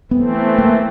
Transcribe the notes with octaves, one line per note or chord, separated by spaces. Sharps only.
E3 A3 B3 C4
A#3